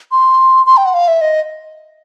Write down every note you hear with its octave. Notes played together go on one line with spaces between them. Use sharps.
C6
C6
G5
F#5
F5
E5
D#5